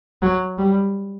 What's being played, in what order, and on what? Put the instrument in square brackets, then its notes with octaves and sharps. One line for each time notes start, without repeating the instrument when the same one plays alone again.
[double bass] F#3
G3